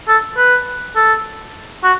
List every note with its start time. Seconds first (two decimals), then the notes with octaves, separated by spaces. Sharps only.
0.08 A4
0.37 B4
0.96 A4
1.84 F#4